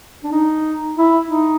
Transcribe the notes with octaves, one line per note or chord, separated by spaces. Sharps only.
D4
D#4
E4
D#4